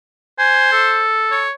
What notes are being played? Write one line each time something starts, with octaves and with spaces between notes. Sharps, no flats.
C5 G#5
A4
C#5